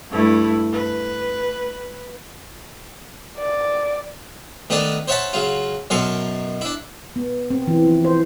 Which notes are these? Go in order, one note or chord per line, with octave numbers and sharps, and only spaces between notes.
G2 A3 E4
B4
D5
D#3 A3 B3 D4 A4
C5 C#5 E5 F#5 A5 B5
C#3 F#3 F4
F#2 B2 A4 A#4 C6 C#6
D4 E4
B3
C4
E3
F3
C5